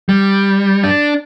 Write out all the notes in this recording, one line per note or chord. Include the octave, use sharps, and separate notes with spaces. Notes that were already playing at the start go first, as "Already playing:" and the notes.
G3
D4